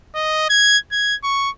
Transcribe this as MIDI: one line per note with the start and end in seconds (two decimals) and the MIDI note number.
0.15 0.47 75
0.50 0.78 92
0.92 1.15 92
1.24 1.50 85